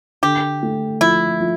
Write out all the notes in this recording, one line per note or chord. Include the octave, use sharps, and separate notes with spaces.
D3 G4
A3
F3 E4
F3